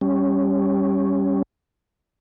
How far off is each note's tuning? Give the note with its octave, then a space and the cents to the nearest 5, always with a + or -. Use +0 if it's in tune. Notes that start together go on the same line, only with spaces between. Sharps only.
G3 +0 C#4 +0